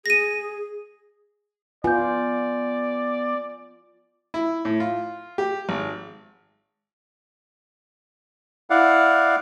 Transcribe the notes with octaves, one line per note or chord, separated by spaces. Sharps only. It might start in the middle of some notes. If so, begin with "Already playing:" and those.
G#4 A#6 D#7
B3 F4 D5 G#5 G6
E4
A2
F4
G4
G#1
E4 D5 F5 F#5